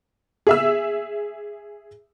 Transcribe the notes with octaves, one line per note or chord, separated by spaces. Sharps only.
G#4 E5 E6